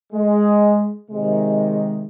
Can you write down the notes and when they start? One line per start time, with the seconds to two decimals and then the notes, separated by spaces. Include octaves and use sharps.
0.13 G#3
1.11 C3 D#3 G#3